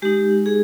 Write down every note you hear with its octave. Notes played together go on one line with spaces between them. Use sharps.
G#3 D#4 G4
G#4